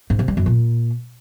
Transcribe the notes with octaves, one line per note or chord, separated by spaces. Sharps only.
G#2
C3
G3
F#2
A#2